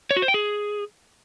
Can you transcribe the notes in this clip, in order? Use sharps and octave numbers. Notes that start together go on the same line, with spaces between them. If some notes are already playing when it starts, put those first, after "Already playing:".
C#5
F#4
C5
G5
G#4